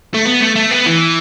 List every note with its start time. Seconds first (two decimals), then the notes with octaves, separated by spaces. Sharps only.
0.14 A3
0.25 B3
0.40 A3
0.55 A3
0.71 B3
0.86 E3